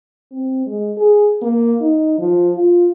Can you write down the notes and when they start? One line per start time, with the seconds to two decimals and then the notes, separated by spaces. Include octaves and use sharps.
0.32 C4
0.67 G#3
0.97 G#4
1.42 A#3
1.81 D#4
2.19 F3
2.55 F4